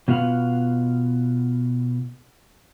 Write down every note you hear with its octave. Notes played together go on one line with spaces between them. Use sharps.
B2 B3 F4 F5 F#5